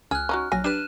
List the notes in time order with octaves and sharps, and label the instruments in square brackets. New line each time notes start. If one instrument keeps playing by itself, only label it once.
[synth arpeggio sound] C#2 [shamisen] G#4 [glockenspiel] F6 F#6
[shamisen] C#4 D#4 F#4
[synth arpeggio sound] A#1 F#3 A#6 [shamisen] G#5
[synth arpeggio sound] D4 G4 B4 [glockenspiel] F#6 D#7 E7